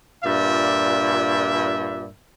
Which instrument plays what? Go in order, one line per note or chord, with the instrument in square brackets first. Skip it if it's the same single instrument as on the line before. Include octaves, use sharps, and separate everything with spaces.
[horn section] G2 A#2 F4 D5 E5